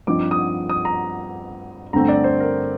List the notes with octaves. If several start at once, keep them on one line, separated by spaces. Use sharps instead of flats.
G2 F3 C4 D#4 D6
D#6
D#6
A#5
G2 D3 A3 C4 A#5
D5
C5
A#4